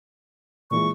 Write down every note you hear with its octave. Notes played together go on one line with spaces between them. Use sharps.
A#2 E3 G#3 C#6